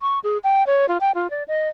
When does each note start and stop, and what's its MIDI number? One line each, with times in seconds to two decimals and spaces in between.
0.01 0.19 85
0.24 0.38 68
0.44 0.66 79
0.67 0.86 73
0.89 0.98 65
1.01 1.12 79
1.15 1.30 65
1.30 1.43 74
1.48 1.68 75